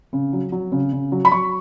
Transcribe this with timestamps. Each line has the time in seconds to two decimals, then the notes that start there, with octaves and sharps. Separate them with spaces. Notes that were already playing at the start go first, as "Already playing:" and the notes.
0.13 C#3
0.33 F#3
0.52 F#3
0.72 C#3
0.92 C#3
1.12 F#3
1.25 B5
1.31 F#3 C#6